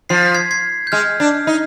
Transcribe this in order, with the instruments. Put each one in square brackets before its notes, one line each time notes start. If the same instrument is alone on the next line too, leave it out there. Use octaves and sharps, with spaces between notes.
[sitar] F3 [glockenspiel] C7
[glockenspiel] B6
G#6 C7
G#6 C7
G6
[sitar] G#3 [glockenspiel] F6 G#6
[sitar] D4
D#4